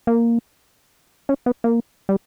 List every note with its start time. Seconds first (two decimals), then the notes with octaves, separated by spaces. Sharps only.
0.07 A#3
1.29 C#4
1.46 B3
1.64 A#3
2.09 G3